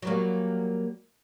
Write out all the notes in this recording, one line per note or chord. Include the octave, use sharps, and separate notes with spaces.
F#3 G3 A#3